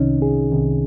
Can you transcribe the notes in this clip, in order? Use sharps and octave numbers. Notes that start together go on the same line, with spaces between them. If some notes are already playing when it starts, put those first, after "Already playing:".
Already playing: C2 C3 D#3 C#4 D#4
G#4
C2 C3 D#3